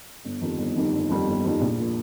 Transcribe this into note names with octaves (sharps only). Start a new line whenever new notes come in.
G1
F2 D#3 G3 D#4
G1
F2 D#3 G3 D#4
G1
F2 D#3 G3 D#4
G1
F2 D#3 G3 D#4
A#1
A#2 F3